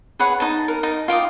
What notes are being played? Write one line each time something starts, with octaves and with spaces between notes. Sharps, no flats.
G#4 B4 C#5 F#5
D#4 A5
A#4
D#4 A5
F4 G5 D6 D#6